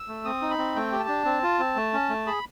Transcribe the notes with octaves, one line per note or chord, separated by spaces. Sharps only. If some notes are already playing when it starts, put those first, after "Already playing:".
Already playing: E6
A3
C4 D#6
D#4
B5
C4
A3 G5
G4
A5
D4
C4
F4
C4
A3
C#4
A3
G#4 B5